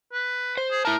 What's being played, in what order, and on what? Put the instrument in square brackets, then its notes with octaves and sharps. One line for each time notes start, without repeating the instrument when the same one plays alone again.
[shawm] B4
[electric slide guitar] C5
[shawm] G#4
[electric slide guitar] E4 A5 [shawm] A#4